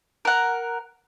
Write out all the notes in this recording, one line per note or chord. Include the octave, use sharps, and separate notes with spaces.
A#4 F#5